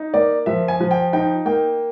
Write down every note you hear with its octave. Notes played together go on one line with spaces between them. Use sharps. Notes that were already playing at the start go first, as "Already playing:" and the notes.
Already playing: D#4
A#3 D5
F3 E5
G#5
F3
G5
D#4 G5
A#3 G5